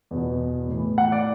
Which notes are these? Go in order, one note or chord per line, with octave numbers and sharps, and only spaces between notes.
E2 B2
A2 E3
F#5
D5